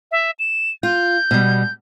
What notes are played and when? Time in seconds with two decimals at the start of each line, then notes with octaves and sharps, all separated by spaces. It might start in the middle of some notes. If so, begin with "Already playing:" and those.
0.11 E5
0.39 E7
0.83 F4 G6
1.31 B2 G3